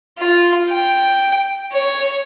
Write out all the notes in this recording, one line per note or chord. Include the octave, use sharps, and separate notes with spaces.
F4
G5
C#5